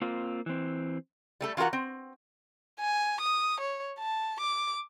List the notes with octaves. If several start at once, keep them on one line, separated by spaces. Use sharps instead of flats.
A#3 C4 F4
E3 C4
G3 A3 A4
E3 F4 F#4 A#4 F#5
C4
G#5
D#6
C#5
A5
D6